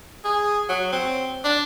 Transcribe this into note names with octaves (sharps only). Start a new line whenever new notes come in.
G#4
F#3
C4
D4